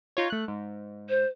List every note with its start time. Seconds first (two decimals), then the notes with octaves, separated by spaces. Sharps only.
0.17 D#4 F4 C#5
0.30 A3 F#6
0.48 G#2
1.09 C5